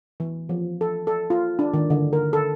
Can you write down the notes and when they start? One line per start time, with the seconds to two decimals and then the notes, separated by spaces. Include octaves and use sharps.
0.20 E3
0.49 F3
0.81 A4
1.07 A4
1.30 F4
1.59 D4
1.74 D#3
1.90 D3
2.13 A#4
2.33 A4